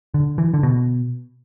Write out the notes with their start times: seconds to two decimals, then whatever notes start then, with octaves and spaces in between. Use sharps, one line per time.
0.14 D3
0.38 E3
0.54 D3
0.63 B2